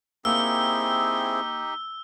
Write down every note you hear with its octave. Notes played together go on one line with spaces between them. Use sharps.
A#3 C4 D#4 E4 G4 G#4 E6